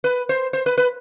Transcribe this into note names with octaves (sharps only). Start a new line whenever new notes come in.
B4
C5
C5
B4
B4